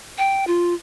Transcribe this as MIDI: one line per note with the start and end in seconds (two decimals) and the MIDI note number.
0.18 0.45 79
0.47 0.74 65